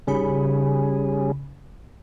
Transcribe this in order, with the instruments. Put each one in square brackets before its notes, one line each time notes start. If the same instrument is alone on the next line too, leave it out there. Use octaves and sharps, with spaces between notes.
[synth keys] G#1 C#3 B5 [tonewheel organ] G3 C#4 G#4